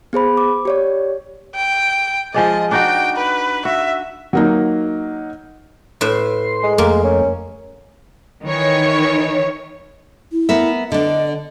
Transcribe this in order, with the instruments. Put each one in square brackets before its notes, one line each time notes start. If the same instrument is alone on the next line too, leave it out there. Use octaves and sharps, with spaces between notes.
[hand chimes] B3 G#4 C5 B5
D6
G4 C#5 D5
[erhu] G5
[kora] F3 G#3 D5 [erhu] D#5
[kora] D4 D#4 F#4 [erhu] G5
[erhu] B4
[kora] F#4 [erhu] E5
[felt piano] F#3 A#3 D#4
[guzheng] A2 B4 E5 [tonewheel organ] C6
[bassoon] G#3
[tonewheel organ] F2 A3 [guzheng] A#3
[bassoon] C#4
[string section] D#3 E3 C#5
[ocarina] E4
[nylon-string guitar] B3 A#4 E5
[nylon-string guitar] D3 D4 [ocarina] D#5